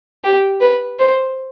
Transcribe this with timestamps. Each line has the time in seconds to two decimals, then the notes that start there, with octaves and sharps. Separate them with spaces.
0.24 G4
0.61 B4
1.00 C5